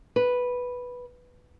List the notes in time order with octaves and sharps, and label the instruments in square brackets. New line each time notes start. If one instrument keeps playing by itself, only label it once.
[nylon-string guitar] B4